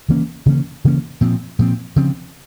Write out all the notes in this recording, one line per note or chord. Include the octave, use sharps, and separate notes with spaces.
C#3 E3 A#3 C#4
C#3 E3 A#3 C#4
C#3 E3 A#3 C#4
A#2 F3 C4
A#2 F3 C4
C#3 F3 C4